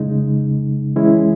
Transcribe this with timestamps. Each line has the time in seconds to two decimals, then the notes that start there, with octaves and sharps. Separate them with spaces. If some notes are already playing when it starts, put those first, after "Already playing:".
Already playing: C#3 G#3 D#4
0.96 E3 G#3 C#4 E4